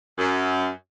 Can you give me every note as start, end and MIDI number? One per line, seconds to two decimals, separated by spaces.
0.18 0.67 42